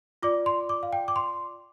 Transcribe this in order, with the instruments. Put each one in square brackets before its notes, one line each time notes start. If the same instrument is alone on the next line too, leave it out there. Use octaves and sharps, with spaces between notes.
[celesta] F4 D5 D6
C6
D6
F5
G5
D6
C6